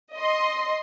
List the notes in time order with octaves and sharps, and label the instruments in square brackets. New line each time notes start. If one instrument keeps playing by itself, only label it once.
[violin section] D#5 C6